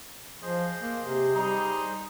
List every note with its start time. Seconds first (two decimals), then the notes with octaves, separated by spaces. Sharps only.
0.42 F3 G#4 C5 D#5
0.81 A#3
1.04 C3
1.36 G3 D#4